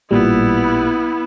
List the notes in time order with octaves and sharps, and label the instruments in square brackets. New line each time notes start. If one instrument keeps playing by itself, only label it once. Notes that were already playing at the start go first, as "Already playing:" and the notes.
[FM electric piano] A1 A#2 G3 [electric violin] B3 E4